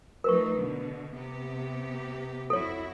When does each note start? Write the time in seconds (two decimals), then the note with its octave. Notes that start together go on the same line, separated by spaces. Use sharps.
0.24 F3 A3 D#4 A#4 B4 C#6
0.56 B2 D3
1.14 C3 B3 G4
2.50 F2 E4 F#4 A4 C#5